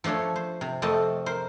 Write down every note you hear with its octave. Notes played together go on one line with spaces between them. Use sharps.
F3 A3 D4 A4 C#5
C5
C3
F2 A3 C4 D#5 A5
A#4 C5